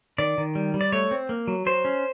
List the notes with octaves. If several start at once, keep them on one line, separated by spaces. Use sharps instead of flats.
D#3 D5
D#3
G3
G3
D5
A3 C#5
C4
A#3
F#3
F#3 C5
C#4